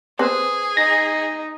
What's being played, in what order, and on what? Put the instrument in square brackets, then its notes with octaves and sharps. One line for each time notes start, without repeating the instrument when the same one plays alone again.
[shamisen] C4 B4 C5 [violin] G#4
[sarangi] D#4 [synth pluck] A#6